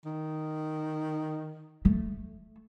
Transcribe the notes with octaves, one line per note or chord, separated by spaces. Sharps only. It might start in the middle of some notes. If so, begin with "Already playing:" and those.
D#3
A3